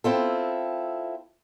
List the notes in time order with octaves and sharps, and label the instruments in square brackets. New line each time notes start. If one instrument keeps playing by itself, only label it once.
[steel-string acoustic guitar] C4 E4 F4 A4